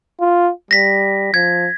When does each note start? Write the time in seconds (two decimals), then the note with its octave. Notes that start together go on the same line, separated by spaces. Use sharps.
0.21 F4
0.71 G3 A#6 B6
1.34 F3 G#6